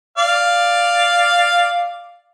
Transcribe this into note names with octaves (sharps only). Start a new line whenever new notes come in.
D5 F5